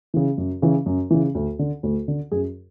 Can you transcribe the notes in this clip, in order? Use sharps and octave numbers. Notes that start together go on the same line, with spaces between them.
C#3 E3
F#2
C#3 E3
F#2
C#3 E3
D2
D3
D2
D3
F#2 G#4